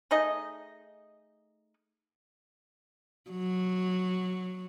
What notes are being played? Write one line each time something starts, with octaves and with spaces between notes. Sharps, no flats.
A3 D#4 G#4 D#5
F#3